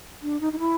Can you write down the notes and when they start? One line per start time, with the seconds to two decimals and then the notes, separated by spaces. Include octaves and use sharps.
0.23 D4
0.41 D#4
0.53 D#4
0.59 E4